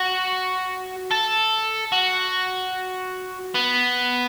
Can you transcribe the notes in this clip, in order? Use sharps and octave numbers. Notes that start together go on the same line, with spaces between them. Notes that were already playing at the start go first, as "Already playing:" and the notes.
Already playing: F#4
A4
F#4
B3